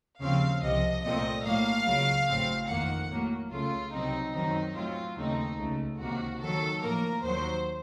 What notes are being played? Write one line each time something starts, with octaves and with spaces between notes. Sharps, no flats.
D#2 C#3 F3 C4 F5
C2 C3 F3 D#5
C2 A#2 A3 C4 D#5
A2 F#3 A#3 F5
C#2 C#3 F#3
A1 A2 F#3 C4
F2 D#3 A#3 F#5
A2 F#3 A#3
C#2 C#3 A3 F4
C2 C3 F#3 C4 D#4
F#2 D#3 F#3 C4 D#4
A2 F#3 C4 F4
D#2 C#3 A3 C4 D#4
C#2 C#3 A3
C#2 C3 D#3 A#3 F#4
D#2 D#3 F#3 A4
A2 F3 A#3 A#4
D#2 D#3 F#3 C5